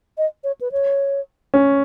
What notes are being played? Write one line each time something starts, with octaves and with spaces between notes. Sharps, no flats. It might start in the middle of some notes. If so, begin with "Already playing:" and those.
D#5
C#5
B4
C#5
C#4